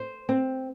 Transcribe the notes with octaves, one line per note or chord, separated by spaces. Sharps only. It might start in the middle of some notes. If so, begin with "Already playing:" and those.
Already playing: C5
C4